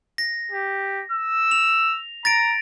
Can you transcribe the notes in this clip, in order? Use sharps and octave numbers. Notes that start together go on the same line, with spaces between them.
A#6
G4
E6
F7
A#5 A6 A#6 D7